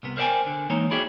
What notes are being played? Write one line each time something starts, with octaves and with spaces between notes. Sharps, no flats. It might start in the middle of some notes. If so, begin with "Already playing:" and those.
C2 C3 B3
A#4 C5 D5 E5 G5 G#5
D3
E3 G#3 A#3 C4 D#4 C#5
E4 F#4 G#4 D5 E5 G5